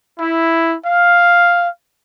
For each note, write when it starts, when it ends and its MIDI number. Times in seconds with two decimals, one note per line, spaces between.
0.19 0.76 64
0.85 1.68 77